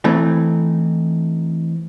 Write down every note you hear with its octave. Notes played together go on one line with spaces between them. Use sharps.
E3 A3 C4 D#4